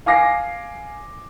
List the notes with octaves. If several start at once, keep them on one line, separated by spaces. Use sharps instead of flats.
F5 G#5 D6 A#6 C7